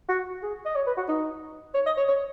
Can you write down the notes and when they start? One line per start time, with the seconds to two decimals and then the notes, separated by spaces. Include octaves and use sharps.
0.09 F#4
0.43 G#4
0.65 D#5
0.76 C#5
0.87 B4
0.97 F#4
1.09 D#4
1.75 C#5
1.86 D#5
1.97 C#5
2.08 C#5